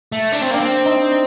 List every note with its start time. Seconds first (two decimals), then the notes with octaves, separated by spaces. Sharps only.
0.12 A3
0.32 D4
0.42 C4
0.51 A#3 D4
0.60 C4
0.85 D#4